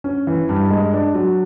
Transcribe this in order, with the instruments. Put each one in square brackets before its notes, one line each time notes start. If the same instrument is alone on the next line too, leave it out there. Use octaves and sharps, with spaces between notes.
[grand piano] C#4
E3
G2
G#3
D4
F#3